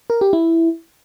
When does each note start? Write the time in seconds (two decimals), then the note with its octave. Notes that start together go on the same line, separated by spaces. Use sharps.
0.10 A#4
0.21 G4
0.33 E4